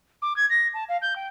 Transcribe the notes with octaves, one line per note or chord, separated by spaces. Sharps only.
D6
G#6
A#6
A5
F5
G6
G5